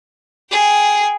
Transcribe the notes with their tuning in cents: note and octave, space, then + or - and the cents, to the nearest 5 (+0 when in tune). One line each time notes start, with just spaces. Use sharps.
G#4 +0 G5 +0